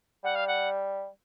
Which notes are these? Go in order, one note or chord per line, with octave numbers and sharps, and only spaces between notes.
G3 F#5
F5
F#5